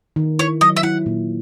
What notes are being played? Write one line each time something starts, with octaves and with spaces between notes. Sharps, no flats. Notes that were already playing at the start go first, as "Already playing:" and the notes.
D#3
E4 C#5
F#3 D#5
E5
E4 F#5
A#2